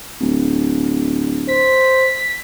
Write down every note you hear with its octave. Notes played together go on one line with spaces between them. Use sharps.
D1
C5 B6